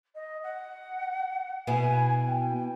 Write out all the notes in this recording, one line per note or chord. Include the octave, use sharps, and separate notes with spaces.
D#5
F#5
B2 B3 E4 G#5
G5